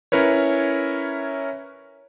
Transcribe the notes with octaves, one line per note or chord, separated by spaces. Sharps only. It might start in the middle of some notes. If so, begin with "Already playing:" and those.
C#4 E4 A#4 B4 C#5